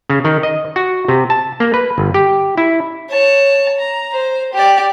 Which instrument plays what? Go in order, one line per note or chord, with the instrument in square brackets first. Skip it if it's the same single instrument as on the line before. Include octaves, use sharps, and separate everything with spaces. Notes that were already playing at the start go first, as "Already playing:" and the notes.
[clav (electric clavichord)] C#3
D#3
D#5
F#4
C3
A5
A#3
B4
G1
G4
E4
[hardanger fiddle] C#5 A5
A#5
C5
G4 D5